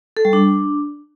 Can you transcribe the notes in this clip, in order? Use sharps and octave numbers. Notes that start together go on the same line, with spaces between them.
A4
G3
D4